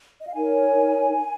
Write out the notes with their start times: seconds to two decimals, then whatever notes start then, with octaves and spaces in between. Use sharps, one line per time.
0.21 D#5
0.27 F5
0.34 D#4 A#4 C#5 G#5